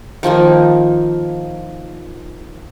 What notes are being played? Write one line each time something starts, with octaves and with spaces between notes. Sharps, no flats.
D#3 F3 A#3 D#4